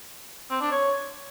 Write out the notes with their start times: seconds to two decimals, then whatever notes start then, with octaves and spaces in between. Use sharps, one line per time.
0.50 C4
0.61 D4
0.71 C#5